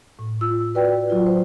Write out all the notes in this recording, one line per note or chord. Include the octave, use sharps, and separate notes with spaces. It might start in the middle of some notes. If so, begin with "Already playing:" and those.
A2
F4 E6
F#4 B4 D5 G5
F#3 F4
C5